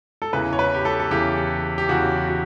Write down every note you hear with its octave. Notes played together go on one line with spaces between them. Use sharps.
A4
E2 C#3 E3 B4
C#5
B4
G4
A4
A4
E2 C#3 E3 G4
G4
E2 C#3 E3 F#4
F#4